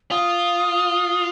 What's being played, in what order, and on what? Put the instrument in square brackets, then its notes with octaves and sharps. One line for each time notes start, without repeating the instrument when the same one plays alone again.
[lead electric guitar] F4 [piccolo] D#6